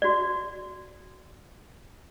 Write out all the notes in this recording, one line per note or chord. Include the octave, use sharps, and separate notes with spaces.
F#4 D5